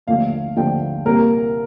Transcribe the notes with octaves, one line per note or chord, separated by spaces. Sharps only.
D#2 D3 F3 A3 F5
D#2 D3 F3 A3 G5
C2 A#2 G3 A#3 A#4